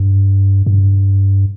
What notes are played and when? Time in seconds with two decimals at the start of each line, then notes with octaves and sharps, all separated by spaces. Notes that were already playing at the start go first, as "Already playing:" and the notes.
Already playing: G2
0.66 G2